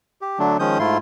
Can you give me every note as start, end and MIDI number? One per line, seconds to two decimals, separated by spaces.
0.21 0.39 67
0.39 0.57 50
0.39 0.57 54
0.39 0.57 57
0.39 0.57 62
0.59 0.78 51
0.59 0.78 53
0.59 0.78 56
0.59 0.78 61
0.59 0.78 87
0.59 0.78 91
0.79 0.98 44
0.79 0.98 57
0.79 0.98 64
0.79 0.98 65
0.79 0.98 84